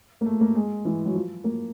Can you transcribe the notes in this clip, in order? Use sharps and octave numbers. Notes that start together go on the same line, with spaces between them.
A#3
A3
A#3
G#3
E3
F#3
F3
A#3